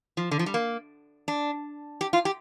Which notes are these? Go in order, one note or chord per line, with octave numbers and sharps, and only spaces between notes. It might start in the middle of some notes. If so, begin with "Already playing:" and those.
F3
D3
F3
G3
A#3
D4
G4
F4
G4